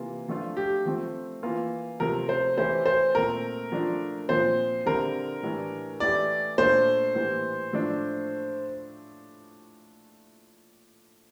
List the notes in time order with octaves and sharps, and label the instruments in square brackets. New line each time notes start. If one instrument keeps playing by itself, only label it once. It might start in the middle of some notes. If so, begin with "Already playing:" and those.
Already playing: [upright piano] C3 E3 A#3 F4
F3 A3 D4 F4
[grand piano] G4
[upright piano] F3 A3 C4
E3 A#3 F4
[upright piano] C3 F3 A3 [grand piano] A#4
[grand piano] C5
[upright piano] E3 A3 E4 G4 [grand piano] C5
[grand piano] C5
[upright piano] A#2 A3 C4 [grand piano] A#4
[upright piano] F3 A3 D4 F4
[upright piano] A#2 F3 C4 [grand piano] C5
[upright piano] D3 G3 C4 E4 [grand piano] A#4
[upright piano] A2 E3 G3 D4
[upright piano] E3 A3 E4 G4 [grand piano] D5
[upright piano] A#2 A3 D4 [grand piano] C5
[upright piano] A2 E3 G3 A#3
A2 F3 A3 D4